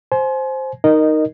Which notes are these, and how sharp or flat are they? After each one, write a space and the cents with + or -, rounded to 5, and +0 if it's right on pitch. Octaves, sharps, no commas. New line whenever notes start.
C5 +5 G#5 +35
D#4 +0 A#4 +0 D#5 -15